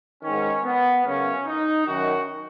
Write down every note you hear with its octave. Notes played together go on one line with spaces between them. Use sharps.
G#2 D#3 C#4
B3
F#2 C#3 C#4
D#4
F#2 D#3 F#4